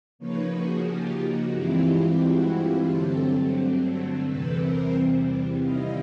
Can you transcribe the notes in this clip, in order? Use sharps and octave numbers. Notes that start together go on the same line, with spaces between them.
C#3 F3 A#3 D#4 B4 C#5
F#4 G#4
F4 G4
F#4
G2 E3 G#3 C4 E4 F4 G4
F#4
F4 G4
G2 D3 F#3 A3 C4 G4 A4
E2 C3 E3 G3 C4 A4 B4
A#4 C5
C3 D#3 G3 C4 E4 D#5 F5